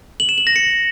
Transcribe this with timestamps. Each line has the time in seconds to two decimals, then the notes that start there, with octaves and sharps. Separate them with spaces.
0.20 F#7
0.29 E7
0.38 F#7
0.47 A#6
0.56 C#7